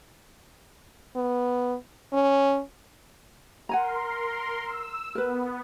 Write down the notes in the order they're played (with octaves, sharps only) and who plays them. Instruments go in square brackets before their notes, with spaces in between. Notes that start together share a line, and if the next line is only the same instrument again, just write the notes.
[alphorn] B3
C#4
[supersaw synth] A#4 C6 [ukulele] F#5 G#5 A#5
[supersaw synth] E6
[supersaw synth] B3 [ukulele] A#4 B4